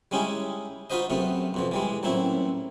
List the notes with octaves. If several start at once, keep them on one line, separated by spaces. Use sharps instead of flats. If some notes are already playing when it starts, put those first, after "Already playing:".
G3 G#3 C#4 D#4 E4 G#4
D#4 F4 F#4 B4 C5 D#5
F#2 C3 A3 B3
F2 B2 F3
E3 G3 G#3
A1 A#2 F#3 C4 E4